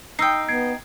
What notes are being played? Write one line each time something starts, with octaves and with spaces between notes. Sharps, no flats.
D#4 G5 D#6 E6 C7
B3 G#6 C7 D7